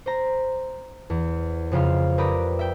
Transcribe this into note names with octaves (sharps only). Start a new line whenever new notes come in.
C5 A#5
E2
F2 C#3 F4 F5
G4 A#4 B4 D5 B5 D#6
E5 G5